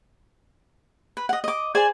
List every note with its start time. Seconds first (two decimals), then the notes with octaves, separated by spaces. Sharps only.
1.17 B4
1.29 D#5 F#5
1.44 D#5 D6
1.75 G#4 C5 D5 G#5